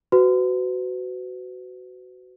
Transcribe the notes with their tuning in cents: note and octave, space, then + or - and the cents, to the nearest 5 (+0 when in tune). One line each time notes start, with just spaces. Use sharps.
F#4 +10 B4 +35